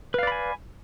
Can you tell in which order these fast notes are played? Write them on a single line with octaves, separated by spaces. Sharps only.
B4 F5 D5 B5 G#5